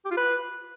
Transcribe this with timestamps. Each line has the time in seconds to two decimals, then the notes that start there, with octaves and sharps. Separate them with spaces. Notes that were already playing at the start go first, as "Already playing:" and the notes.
0.05 G4
0.11 F4
0.17 B4